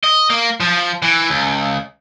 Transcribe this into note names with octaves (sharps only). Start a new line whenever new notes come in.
D#5
A#3
F3
E3
C#2